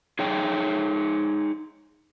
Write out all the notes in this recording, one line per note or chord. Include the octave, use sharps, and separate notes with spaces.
D#4 G#4 C#5 G5